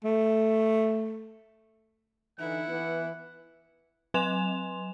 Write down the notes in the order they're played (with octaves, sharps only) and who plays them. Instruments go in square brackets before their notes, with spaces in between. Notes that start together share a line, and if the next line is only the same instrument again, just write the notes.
[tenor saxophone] A3
[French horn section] D3 E3 D#4 [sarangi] E4 [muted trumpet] F#5
[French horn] E3 [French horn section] B3
[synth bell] F#3 B4 G#5 C6 E7 F7